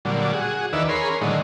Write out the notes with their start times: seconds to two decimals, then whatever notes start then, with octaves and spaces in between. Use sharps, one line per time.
0.05 A#2 D3 F#3 G3
0.33 F#4 G#4
0.73 D#2 D#3 E3 B4 D5 E6
0.89 G#4 A#4 C#5 B5 C6
1.10 C#4 A#4
1.21 A2 D3 D#3 F#3 G#3